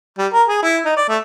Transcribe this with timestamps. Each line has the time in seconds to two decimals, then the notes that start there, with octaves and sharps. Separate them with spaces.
0.18 G3
0.33 A#4
0.48 G#4
0.62 E4
0.85 D#4
0.97 D5
1.09 A3